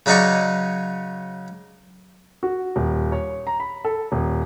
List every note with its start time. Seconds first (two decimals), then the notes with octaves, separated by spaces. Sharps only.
0.06 C#3 F#3 C#4 D#4 D5 C#6
2.43 F#4
2.76 D#1
3.12 C#5
3.47 A#5
3.60 B5
3.85 A4
4.12 D#1